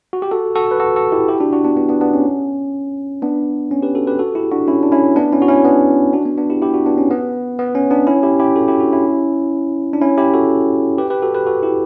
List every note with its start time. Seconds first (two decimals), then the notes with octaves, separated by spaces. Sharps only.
0.13 F#4
0.22 G4
0.31 F#4 A4
0.55 F#4 A4
0.71 B4
0.80 F#4 A4
0.96 F#4 A4
1.12 E4 G4
1.28 E4 G4
1.40 D4 F#4
1.52 D4 F#4
1.65 B3 D4
1.77 B3 D4
1.89 B3 D4
2.01 B3 D4
2.13 C#4
3.22 B3 D4
3.71 C#4
3.82 G4 B4
3.95 F#4 A4
4.07 G4 B4
4.19 F#4 A4
4.35 E4 G4
4.52 D4 F#4
4.68 C#4 E4
4.83 D4
4.92 C#4 E4
5.16 B3 D4
5.32 C#4 E4
5.42 F#4
5.48 C#4 E4
5.64 B3 D4
6.13 D4 F#4
6.25 B3
6.38 B3 D4
6.50 E4 G4
6.62 E4 G4
6.74 D4 F#4
6.86 B3 D4
6.98 C#4
7.10 B3
7.59 B3
7.75 C#4
7.91 B3 D4
8.07 C#4 E4
8.23 E4 G4
8.40 E4 G4
8.56 F#4 A4
8.68 E4 G4
8.80 D4 F#4
8.93 C#4 E4
9.93 D4
10.01 C#4 E4
10.18 E4 G4
10.34 F#4 A4
10.98 G4 B4
11.10 G4 B4
11.22 F#4 A4
11.35 G4 B4
11.47 F#4 A4
11.63 E4 G4